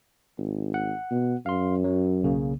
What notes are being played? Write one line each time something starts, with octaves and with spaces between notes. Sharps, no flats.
G#1
F#5
B2
F#2 F5 C6
F#3
B1 C#3 A#3